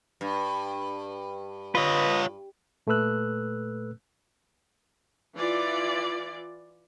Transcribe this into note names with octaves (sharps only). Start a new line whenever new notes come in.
G2
F4 B4 C#5 D#5
A#2 A3 A4 B4 E6 F#6
E3 F4 D5